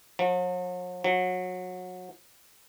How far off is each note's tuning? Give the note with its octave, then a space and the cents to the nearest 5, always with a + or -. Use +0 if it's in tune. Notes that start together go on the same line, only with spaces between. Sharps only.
F#3 -45
F#3 -25